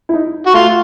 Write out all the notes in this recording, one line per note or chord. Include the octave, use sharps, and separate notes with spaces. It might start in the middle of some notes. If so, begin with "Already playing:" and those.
E4
D#4
F#4
A3 F4